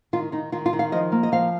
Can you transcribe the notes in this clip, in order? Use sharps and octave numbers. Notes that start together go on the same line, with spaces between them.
D#3 F4
D#3 D#4
D#3 F4
F4
D#3
F5
F3 D#5
A#3
D#5
F3 F5